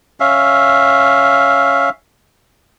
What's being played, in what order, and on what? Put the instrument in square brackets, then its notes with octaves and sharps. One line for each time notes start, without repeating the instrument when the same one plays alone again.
[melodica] C#4 E5 F5